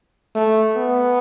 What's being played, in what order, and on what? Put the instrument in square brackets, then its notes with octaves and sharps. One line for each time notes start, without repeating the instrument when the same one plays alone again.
[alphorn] A3
B3